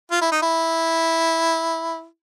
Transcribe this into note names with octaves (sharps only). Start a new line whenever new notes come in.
F4
E4
D#4
E4